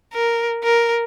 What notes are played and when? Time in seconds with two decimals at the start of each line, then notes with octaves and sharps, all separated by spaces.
0.13 A#4
0.64 A#4